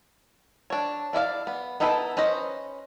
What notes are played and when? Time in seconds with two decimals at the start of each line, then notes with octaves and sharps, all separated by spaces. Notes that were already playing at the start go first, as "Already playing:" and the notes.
0.70 D4 C#5
1.13 D4 E4 D5 F5
1.47 B3
1.80 B3 D#4 E4 A4 B4
2.17 C#4 B4 C5 D#5